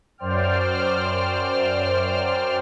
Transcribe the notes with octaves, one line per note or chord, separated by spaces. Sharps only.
F#2 C5 D5 G5 F6